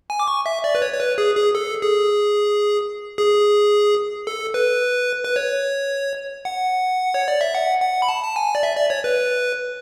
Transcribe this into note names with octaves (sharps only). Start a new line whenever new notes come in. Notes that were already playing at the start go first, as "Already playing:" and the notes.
G#5
D6
C#6
E5
D5
B4
C#5
C#5
B4
G#4
G#4
A4
G#4
G#4
A4
B4
B4
C#5
F#5
C#5
D5
E5
F#5
F#5
B5
A5
A5
G#5
D5
E5
D5
C#5
B4